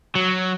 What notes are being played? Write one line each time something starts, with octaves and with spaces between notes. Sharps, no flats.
F#3